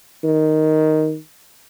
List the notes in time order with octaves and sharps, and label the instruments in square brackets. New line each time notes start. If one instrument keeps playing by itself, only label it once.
[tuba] D#3